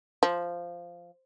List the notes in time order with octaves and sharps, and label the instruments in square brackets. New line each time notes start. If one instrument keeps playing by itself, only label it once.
[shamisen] F3